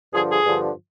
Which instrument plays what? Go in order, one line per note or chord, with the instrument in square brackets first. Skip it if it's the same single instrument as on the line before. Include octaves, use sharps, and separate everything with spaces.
[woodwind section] G2 D3 F3 G#4
G#4
G2 D3 F3